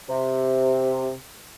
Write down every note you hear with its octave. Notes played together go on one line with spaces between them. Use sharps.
C3